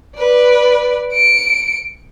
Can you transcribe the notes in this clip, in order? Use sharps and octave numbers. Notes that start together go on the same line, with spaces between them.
B4 D5
C#7 D7